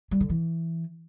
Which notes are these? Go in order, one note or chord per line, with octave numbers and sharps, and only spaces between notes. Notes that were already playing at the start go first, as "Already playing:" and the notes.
G3
D3
E3